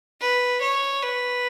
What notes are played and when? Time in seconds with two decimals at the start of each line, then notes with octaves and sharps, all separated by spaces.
0.21 B4
0.62 C#5
1.02 B4